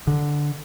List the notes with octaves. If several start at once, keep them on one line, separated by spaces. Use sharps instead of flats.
D3